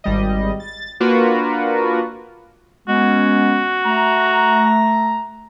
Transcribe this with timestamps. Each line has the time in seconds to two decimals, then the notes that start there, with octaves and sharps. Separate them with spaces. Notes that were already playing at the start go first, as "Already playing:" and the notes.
0.04 G#1 G3 D#5
0.60 A6
1.00 A#3 D4 F4 F#4 A#4 B4
2.88 G#3 B3 C#4 F#4
3.85 A3 A#5